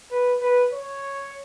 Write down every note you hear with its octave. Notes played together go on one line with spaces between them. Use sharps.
B4
B4
C#5